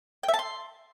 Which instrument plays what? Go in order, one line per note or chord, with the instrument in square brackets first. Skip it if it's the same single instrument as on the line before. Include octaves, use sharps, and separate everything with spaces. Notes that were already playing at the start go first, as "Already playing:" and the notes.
[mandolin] G5
E5
A5
C6